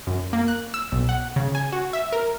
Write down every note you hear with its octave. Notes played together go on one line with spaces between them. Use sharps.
F#2
A#3
F#6
E6
B1
F#5
C#3
G#5
F#4
E5
A#4